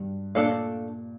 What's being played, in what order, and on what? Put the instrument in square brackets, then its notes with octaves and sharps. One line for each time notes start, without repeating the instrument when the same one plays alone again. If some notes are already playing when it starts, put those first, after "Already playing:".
Already playing: [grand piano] G2
[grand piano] A#2 [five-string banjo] A3 D4 A4 D5 F5